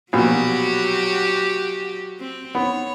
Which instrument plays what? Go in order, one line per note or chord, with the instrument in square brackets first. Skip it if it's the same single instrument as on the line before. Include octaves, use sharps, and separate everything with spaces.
[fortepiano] A#1 B2 [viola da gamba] F#3 F#4 G4
[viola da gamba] C4
[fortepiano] B3 [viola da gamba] C#5